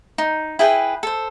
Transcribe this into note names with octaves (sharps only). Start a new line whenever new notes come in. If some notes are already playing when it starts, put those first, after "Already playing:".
D#4
E4 G#4 B4 G5
A4 C5